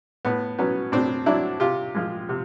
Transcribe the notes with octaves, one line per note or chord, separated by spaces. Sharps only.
A2 B3
F#3 B3 C#4
A2 C4 D4
F#3 D4 E4
C3 F4 G4
F3 G#3
C3